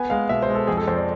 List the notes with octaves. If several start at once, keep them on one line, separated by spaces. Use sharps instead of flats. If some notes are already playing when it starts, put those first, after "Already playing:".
Already playing: B3 G#5
G#3 F5
B2 E5
C5
G#3
A4
F2 G#4
A4
F2 C5
D5